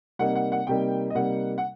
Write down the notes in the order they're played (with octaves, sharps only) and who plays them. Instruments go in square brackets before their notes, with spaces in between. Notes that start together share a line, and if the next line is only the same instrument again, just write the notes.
[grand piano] C3 G3 A#3 D#4 F#5
F#5
F#5
C3 G3 A#3 D#4 G5
D#5
C3 G3 A#3 D#4 F#5
F#5